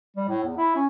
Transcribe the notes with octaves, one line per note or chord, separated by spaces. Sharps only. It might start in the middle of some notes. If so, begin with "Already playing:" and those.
G3
A2
E2
E4
C#4